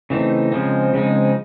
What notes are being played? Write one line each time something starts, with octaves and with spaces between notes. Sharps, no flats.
C#3 E3 A3 C4 D#4
C#3 F3 G#3 C4 D#4
C#3 F3 G#3 C4 D#4